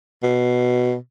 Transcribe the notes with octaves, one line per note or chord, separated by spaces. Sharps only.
B2